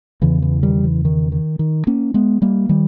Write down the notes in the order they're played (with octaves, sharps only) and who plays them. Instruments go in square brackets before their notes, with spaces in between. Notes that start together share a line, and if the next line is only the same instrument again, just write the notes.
[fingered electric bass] E2 C#3 E3
E3
D#3 G3
E3
D#3
D#3
D#3
A#3 C#4
G#3 B3
G3 A#3
D#3 G3